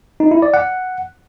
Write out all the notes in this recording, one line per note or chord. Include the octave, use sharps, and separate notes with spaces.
D#4
E4
D5
F#5